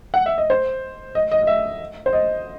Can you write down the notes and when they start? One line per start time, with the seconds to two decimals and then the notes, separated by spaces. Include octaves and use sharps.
0.14 F#5
0.26 E5
0.38 D#5
0.50 C5
1.15 D#5
1.32 D#5
1.43 D#5
1.47 E5
2.06 C5
2.13 D#5